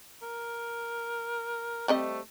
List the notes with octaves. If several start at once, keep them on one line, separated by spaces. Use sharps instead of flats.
A#4
G3 A3 C4 D#5